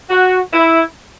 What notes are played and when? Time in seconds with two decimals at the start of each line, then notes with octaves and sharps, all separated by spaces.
0.10 F#4
0.53 E4